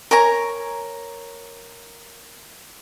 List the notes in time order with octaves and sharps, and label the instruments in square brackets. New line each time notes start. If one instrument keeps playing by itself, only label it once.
[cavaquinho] A#4 C#5 G#5 A#5